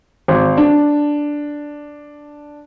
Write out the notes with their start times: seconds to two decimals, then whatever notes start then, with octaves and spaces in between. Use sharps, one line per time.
0.28 G#1
0.57 D4